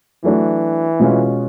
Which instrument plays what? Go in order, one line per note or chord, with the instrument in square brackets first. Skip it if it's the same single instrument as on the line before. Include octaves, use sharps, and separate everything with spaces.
[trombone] E3 [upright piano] F#3 A3 D4 F#4
[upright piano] B2 G#3 C#4 F4